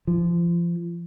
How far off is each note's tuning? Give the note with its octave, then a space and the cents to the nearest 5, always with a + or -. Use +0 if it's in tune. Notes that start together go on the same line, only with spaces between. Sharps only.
F3 -30